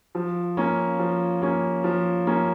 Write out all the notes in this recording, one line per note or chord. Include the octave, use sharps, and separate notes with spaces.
F3
A#3 C#4
F3
A#3 C#4
F3
A#3 C#4